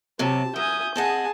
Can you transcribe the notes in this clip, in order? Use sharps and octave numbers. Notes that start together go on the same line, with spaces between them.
C3 F#3 C4 G4 A5
F#2 E5 G#5 D#6 G6
C4 G#4 D#5 F#5 G#5 A5